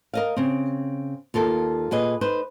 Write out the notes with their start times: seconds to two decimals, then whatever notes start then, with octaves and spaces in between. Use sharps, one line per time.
0.14 A#4 D#5 F5
0.36 C#3 C4
1.34 D#2 F4 A4 A#4
1.91 A#2 G#4 B4 D#5
2.21 D#4 B4 C5